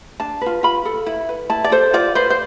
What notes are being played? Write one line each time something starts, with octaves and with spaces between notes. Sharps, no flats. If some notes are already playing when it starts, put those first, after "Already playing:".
D4 A5
F4 B4
F4 B5
A4
E4
B4
E4 A5
D5
A4 C5
F4 D5
B4 C5
C5